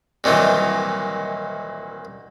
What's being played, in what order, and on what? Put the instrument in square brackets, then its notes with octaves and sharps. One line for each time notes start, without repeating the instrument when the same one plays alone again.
[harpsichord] C2 A#2 D#3 E3 F#3